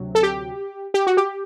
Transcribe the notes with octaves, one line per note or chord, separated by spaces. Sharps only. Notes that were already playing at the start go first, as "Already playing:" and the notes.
Already playing: D2 C3 F#3
A4
G4
G4
F#4
G4